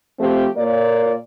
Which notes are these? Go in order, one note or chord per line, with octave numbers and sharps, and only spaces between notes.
F3 A3 C4 G4
A#2 A#3 C#5 D5